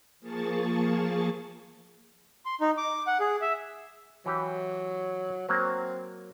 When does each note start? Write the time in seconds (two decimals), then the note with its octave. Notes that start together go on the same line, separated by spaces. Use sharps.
0.20 F3 A#3 G#4 A5 C#6 A6
2.45 C6
2.61 D#4
2.77 D6
3.07 F#5
3.20 G#4
3.41 E5
4.26 E3 F#3 G4
5.49 F#3 A#3 C4